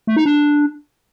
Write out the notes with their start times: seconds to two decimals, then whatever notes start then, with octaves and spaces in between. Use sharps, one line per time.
0.07 A3
0.16 D#4
0.26 D4